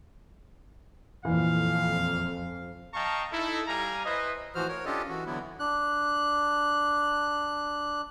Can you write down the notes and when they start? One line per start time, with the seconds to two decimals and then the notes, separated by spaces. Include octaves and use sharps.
1.25 F2 A#2 E3 F5
2.94 D#5 F5 G5 A5 A#5 C#6
3.32 D#4 E4 A4
3.67 G3 F5 G#5 A#5
4.05 E4 B4 C5 D#5
4.55 A2 E3 F3 F#4 C5 F6
4.68 A#4 C#5
4.85 C#4 D4 F4 G4 A4 D#5
5.09 E3 F#4
5.26 D3 E3 F#3 B3 E4
5.60 D4 F#6